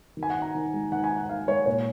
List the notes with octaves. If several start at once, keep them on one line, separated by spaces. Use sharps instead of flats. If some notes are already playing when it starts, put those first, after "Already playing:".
D#3
G#5
F#5
D#4
A#5
D#3
G#3
D#3 F#5
G#5
D#4
F#5
D#3 F5
G#3 C#5
A#2 C#5